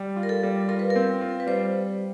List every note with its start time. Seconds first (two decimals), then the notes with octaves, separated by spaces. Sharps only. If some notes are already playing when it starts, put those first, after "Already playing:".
Already playing: G3
0.16 F4
0.23 A#4
0.29 A4
0.43 G3
0.68 F4 A#4
0.79 B4
0.90 A#4
0.95 C4
1.21 F4
1.40 B4
1.47 G3 C5